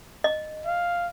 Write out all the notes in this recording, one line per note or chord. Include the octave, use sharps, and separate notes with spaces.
D#5
F5